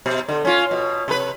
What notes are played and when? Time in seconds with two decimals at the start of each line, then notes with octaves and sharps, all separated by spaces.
0.06 B2
0.29 D3
0.45 C#4 F4
0.71 B2
1.08 C3 B4